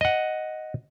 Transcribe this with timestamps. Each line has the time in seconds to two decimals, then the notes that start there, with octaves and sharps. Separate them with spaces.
0.01 D#5 F#5